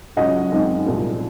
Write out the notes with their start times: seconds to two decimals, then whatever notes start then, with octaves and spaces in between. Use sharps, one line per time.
0.17 C#2 C#3 F#3 C#4 D#5 F#5
0.52 F#2 D#3 G#3 C4 D#4
0.86 C2 A#2 F3